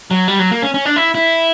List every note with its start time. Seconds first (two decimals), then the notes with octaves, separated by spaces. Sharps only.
0.11 F#3
0.28 G3
0.39 F#3
0.51 A#3
0.62 C#4
0.74 C#4
0.85 D4
0.96 E4
1.15 E4